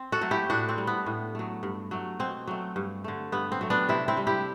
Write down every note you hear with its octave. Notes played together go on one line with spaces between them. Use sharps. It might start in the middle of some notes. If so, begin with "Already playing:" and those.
Already playing: C4
F#4 A4
F#3 A3
E4 G4
A2 D4 F#4
C4
G3
B3
A2
F#3 A3
G2
F#3 A3
B2 C4
F#3 A3
G2
D3 A3
G2 B3
C4
F#3 A3
B3 D4
C3 C4 E4
C4 E4
G3
E4 G4